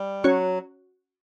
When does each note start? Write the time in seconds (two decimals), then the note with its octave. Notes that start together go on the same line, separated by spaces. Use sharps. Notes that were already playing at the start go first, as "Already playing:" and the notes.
Already playing: G3
0.24 F#3 C#4 F#4 C#5